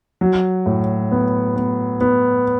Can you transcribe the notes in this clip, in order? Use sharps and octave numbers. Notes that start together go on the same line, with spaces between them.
F#3
A2
B3
B3
B3